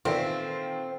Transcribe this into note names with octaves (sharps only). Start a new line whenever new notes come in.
A#2 D#3 E3 C4 F4 A4 E5